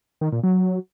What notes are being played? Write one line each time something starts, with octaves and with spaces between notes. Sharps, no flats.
D#3
A#2
F#3